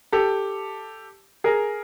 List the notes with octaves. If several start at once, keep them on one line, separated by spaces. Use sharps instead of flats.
G4 A4
G#4 A#4